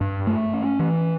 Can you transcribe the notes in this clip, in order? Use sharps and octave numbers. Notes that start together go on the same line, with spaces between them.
G2
A3
C#4
E3